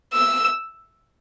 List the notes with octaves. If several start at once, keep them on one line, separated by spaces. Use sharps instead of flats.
E6